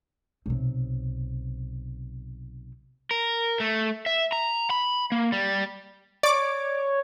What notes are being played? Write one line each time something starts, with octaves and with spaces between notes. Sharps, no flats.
B1 C3
A#4
A3
E5
A#5
B5
A#3
G3
C#5 D5 D6